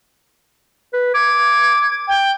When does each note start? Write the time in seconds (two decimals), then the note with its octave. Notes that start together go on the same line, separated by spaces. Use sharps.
0.94 B4
1.14 D6 G#6
2.08 G5